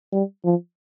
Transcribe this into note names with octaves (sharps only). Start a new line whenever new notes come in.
G3
F3